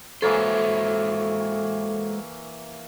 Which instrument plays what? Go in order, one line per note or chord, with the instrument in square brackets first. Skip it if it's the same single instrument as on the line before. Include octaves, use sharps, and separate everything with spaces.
[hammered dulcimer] E3 A#3 C#5 [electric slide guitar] G#3 F#4 C5 [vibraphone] A4